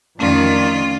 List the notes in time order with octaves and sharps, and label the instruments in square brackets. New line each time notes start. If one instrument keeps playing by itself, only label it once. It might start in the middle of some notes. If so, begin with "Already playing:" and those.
[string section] F2 D#3 D5 [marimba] A3 C#4 [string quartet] F4